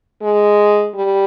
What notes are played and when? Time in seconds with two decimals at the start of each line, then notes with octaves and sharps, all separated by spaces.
0.22 G#3
0.95 G3